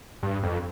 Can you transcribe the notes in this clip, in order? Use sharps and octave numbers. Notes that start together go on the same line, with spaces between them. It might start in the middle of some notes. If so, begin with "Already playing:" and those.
G2
F2